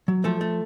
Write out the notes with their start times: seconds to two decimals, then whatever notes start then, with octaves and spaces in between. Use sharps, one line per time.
0.08 F#3
0.24 F3 A3 A4
0.41 A3